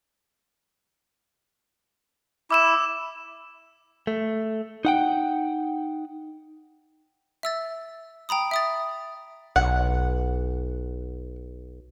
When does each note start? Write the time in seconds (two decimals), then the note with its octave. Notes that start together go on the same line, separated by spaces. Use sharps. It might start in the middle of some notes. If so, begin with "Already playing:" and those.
2.51 E4 D6 E6 E7
4.07 A3
4.85 D#4 F#5 G5
7.43 E5 E6 A6
8.29 G5 A#5 B5 D#6
8.51 E5 D#6 A6
9.56 B1 F#5